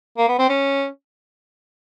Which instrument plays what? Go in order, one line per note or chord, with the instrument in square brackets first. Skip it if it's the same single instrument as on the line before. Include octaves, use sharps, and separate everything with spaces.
[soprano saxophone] A#3
B3
C4
C#4